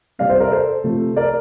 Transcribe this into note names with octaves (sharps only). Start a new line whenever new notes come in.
C3 G3 A#3 D5 F5
C5 E5
A#4 D5
A4 C5
C3 F3 A3
A#4 D5